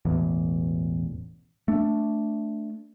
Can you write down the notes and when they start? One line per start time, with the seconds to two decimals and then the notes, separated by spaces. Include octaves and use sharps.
0.05 E1 A1 E2
1.68 A3 D4